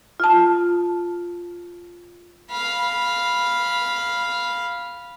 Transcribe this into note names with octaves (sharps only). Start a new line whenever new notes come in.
F4 A5
F5 B5